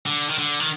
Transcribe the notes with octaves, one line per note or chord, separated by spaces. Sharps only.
D3
D#3
D3
D#3